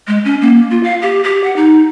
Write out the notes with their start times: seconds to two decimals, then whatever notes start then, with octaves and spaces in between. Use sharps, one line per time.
0.07 G#3
0.25 C#4
0.41 A#3
0.70 F4
0.83 F5
1.02 G4
1.24 G4
1.44 F#5
1.56 D#4